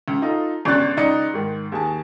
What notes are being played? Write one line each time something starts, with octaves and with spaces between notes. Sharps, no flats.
C#2
D#4 F4 A4
G1 C#2 D4 C#6 F#6 A6
C#2 D#4 D5 C#7
G#2 D#3
D#2 G#4 A5